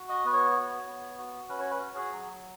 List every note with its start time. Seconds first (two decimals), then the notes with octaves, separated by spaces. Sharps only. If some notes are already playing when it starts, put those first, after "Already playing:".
Already playing: F#4
0.09 D#5
0.25 B3 B4
0.33 C#5
0.56 F#4
0.87 B3
1.18 F#4
1.49 C#4 B4
1.60 C#5
1.70 B4
1.80 F#4
1.96 G#4
2.12 F#3